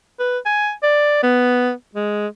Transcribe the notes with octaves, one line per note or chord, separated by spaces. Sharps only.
B4
G#5
D5
B3
G#3